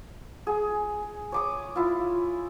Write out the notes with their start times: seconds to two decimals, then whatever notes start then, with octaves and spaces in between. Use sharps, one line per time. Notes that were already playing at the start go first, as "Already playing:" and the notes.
0.47 G#4
1.32 C#5 D6 D#6
1.76 E4 F4